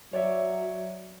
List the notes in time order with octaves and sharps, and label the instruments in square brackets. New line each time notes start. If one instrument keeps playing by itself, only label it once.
[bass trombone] F#3 [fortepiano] C#5 D5 E5